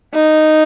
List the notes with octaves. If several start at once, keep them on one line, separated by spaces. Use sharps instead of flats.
D#4